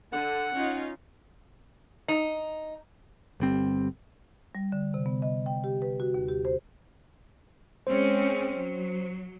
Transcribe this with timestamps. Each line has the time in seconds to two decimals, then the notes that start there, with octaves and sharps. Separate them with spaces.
0.13 D3 F#5
0.56 C#4 D#4 F4
2.08 D#4
3.40 G1 G3 C4
4.55 G3
4.72 D3
4.94 C3
5.06 B3
5.22 D#5
5.46 G5
5.64 G4
5.82 B4
6.00 F#4
6.14 D#2
6.29 G4
6.45 C5
7.87 G#3 C4 C#4 C5
8.56 F#3